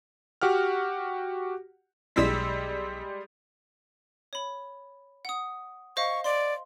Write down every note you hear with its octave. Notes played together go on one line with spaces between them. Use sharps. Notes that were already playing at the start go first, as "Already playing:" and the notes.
F#4 G4 F#5 F6
B1 G3 G#3 E6 B6
C#5 B5
F#5 D#6
C5 D#5 F5 C#6
D5 C6